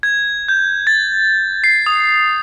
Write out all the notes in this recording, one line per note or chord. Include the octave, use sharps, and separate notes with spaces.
G#6
G6
A6
C7
D#6